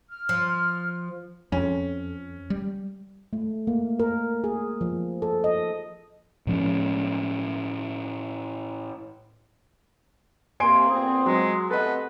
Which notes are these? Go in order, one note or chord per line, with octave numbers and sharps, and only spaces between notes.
F6
F3
F2 C#4
G3
A3
A#3
A#4
G#4
F3
A4
D#5
A2 F3 C#4
C3 A#3 G#5 C6 D7
A#2 B3 C4 G#4
F#3 G#3
C3 A3 B3 A4 B4 D#5